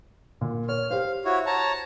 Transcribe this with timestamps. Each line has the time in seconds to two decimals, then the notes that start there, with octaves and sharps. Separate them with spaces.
0.41 A#2
0.69 C#5 F6
0.91 G4 C5 F5
1.25 E4 F#4 C#5
1.46 C#5 A5 A#5